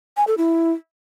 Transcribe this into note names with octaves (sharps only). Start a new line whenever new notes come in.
G#5
A4
E4